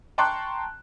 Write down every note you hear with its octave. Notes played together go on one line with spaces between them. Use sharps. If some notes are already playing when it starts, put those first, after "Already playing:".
G5 A5 A#5 C6 C#6 F#6